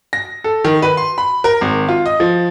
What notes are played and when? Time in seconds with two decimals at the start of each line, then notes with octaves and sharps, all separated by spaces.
0.13 A#6
0.44 A4
0.65 D#3
0.82 B4
0.97 C6
1.18 B5
1.44 A#4
1.61 G#1
1.89 F4
2.06 D#5
2.20 F3